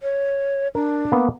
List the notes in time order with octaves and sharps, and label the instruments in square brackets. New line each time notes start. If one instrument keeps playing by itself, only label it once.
[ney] C#5
[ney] D4 [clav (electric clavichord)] A#4
[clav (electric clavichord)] A#3 B3